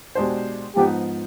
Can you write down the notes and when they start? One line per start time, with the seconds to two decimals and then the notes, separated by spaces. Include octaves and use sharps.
0.15 B2 G#3 D4 G4 C5
0.76 G#2 F3 B3 D#4 G4